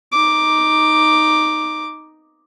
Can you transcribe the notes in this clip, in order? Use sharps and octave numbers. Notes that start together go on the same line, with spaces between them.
D#4 D6